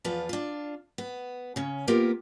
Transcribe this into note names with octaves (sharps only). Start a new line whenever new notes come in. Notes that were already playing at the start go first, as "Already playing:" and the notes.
E2 F3 F4 B4
D4 F4
B3
C#3 C#4
A#3 B3 F4 G4 A#4